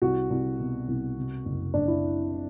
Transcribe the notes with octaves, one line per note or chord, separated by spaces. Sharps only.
C2 F#4
C2
B2
C2
C3
F#1
F#1 D4
E4